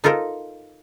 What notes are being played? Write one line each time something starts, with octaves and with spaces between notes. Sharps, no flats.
D#4 F4 A4 A#4 C5